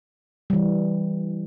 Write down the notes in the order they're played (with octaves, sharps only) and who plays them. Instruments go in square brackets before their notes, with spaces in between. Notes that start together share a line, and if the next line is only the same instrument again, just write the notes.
[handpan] E3 G3